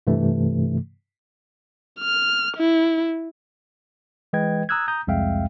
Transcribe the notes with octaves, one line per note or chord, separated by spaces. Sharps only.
G2 C3 E3 A3
F6
E4
E3 G#3 B4 D#5 G5 G#6
A#5 D#6 E6 F#6 G#6
A#5 D#6 G6
C2 F2 G#3 E5 F5 G5